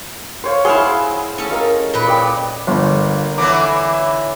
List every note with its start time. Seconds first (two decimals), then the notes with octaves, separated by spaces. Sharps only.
0.44 C5 C#5 F5
0.65 E4 G#4 C5 F5 F#5 C6
1.38 C#4 A4
1.50 A#4 D#5 F5
1.94 A#2 B4
2.07 D5 D#5 G5
2.67 G1 A#3
3.38 D3 E3 C#4 E4 D6